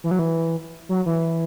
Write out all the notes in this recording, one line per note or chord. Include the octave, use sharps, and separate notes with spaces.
E3
F#3
E3
F#3
E3